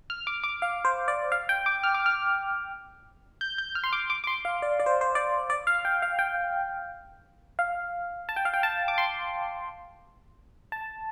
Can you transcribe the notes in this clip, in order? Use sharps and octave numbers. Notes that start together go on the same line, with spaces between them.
F6
D6
D6
F5
C5
D5
F5
G5
D6
F6
D6
F6
G6
G6
F6
C6
D6
D6
D6
C6
F5
D5
D5
C5
C5
D5
D5
F5
G5
F5
G5
F5
A5
G5
F5
G5
A5
D6
C6
A5